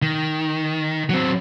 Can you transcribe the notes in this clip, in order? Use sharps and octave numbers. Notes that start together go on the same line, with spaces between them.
D#3
F#3 C4